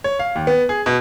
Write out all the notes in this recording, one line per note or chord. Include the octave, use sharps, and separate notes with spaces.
C#5
F5
D#2
B3
G#4
B2